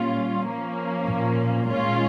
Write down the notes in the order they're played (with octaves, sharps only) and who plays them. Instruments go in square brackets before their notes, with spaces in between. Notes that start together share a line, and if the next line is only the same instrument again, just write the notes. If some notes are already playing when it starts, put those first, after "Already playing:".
Already playing: [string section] A#2 G3 C#4 F4
F3 A#3 C#4
[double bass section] A#2
[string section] D#3 G#3 C#4 F4